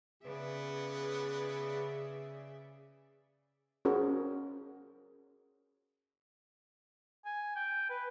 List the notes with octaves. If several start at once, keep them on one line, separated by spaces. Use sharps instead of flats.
C#3 B3 G#4 B4 D5 E5
C#4 F#4 G#4 A#4 C5
G#5
G5
B4